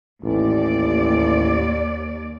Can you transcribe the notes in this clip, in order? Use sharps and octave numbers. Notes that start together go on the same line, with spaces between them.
A1 D#2 D5